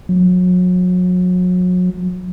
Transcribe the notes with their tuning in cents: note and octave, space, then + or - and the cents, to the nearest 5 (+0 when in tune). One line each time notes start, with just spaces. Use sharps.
F#3 -35